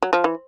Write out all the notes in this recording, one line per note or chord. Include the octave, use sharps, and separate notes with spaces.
F#3
F3
E3